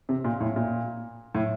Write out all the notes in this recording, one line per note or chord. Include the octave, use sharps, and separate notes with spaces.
C3
A#2
A2
A#2
A2